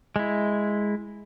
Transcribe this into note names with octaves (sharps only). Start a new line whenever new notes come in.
G#3 E4